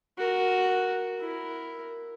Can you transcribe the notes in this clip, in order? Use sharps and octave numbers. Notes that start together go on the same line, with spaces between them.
F#4 A#4
E4 A#4